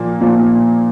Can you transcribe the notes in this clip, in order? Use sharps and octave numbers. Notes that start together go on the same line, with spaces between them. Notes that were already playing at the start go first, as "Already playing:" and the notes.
Already playing: A#2 F3 A#3
A#2 F3 A#3